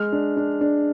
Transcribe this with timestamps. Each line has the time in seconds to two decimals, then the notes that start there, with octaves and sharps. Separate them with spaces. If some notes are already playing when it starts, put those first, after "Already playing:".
Already playing: G#3 F6
0.12 D4
0.37 D4
0.61 D4